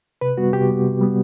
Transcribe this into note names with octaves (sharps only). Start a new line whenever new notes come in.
C3 B4
G3 B3 F#4
C3 G4
G3 B3
C3
G3 B3